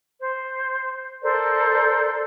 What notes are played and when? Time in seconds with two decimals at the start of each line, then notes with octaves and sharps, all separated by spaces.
0.20 C5
1.22 A4 A#4 C5 D5